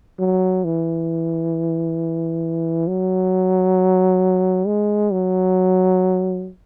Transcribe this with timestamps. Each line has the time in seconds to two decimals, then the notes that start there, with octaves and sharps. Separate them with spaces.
0.19 F#3
0.65 E3
2.88 F#3
4.67 G#3
5.12 F#3